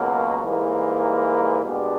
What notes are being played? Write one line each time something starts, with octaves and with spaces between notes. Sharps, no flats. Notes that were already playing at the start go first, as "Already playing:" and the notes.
Already playing: C#2 B2 F#3 A#3
G#2 E3 G3 A#3
B2 G#3 B3 D4 G4